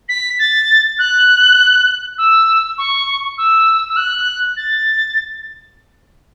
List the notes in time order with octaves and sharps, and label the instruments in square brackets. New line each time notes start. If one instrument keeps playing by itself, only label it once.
[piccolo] B6
A6
F#6
E6
C#6
E6
E6
F#6
A6